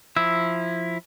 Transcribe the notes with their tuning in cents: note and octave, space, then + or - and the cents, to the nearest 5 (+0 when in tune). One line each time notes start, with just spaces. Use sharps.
F3 +0 E4 +0 E6 +0